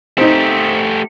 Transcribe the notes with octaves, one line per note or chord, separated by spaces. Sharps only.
A3 C4 D#4 G4